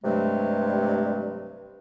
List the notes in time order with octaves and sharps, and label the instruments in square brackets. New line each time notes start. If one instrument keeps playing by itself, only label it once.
[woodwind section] G2 C3 F#3 G#3 A3